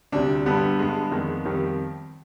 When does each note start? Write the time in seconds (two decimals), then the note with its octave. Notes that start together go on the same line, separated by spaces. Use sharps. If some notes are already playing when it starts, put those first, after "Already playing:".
0.12 D2 C3 G3 D4
0.46 G2 D3 G3 B3
0.79 G2 D3 G#3
1.11 F2 D#3 G#3
1.45 F2 D#3 G3